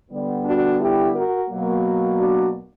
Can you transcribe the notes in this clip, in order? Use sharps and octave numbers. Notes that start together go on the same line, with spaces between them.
D3 G3 B3
D4 F#4
E4 G4
F#4 A#4
B2 F#3 A#3
D4 F#4